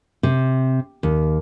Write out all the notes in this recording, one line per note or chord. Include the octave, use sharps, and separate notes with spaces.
C3
D#2